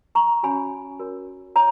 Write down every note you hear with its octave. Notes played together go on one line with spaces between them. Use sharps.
A#5 C#6
C#4 F#4 C#5 G#5 B5
F#4 A#4 C#5
C#5 A#5